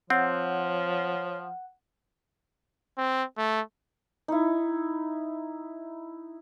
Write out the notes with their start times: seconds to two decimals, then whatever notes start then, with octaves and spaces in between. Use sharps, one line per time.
0.10 F3 C4 C#5 F#5
2.98 C4
3.37 A3
4.28 D#4 E4